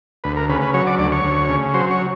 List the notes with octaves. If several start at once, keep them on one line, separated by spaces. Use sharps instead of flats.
D2 B4
A#4
C#3 B4
B4
F#3 C#5
D5
D2 D5
C#5
D2
C#3
F#3 C5
C#5